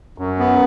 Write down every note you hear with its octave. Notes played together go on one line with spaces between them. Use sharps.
F#2
B3